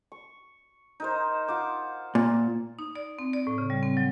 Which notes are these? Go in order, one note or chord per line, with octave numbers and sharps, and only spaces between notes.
C#6
D#4 A#4 C5
F4 F#5 D6
A#2
D#4
D5
C4
D5
A2
C#3
G3
C4
F#3